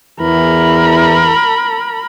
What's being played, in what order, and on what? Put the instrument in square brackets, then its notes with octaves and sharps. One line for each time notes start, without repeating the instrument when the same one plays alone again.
[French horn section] E2 E3 [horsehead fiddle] A#4 B5